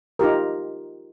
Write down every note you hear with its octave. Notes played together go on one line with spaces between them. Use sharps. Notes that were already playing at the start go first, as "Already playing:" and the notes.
D#4 F4 G4 A#4